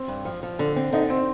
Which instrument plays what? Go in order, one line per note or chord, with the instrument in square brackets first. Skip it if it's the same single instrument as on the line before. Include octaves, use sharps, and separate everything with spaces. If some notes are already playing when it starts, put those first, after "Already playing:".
Already playing: [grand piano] C4
[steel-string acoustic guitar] G2
F3
F3
D3
C4
[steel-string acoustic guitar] D3 [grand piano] D#4
[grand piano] C4